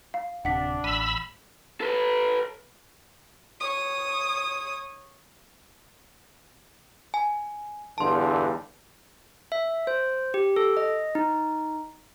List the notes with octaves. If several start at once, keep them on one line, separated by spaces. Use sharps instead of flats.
F5
D1 C3 D4 F#5 B6
A1 B5 E6 D#7
A4 B4
C#5 D#6
G#5
E2 G2 D3 A5 C6
E5
C5
G4
A4
D#5
D#4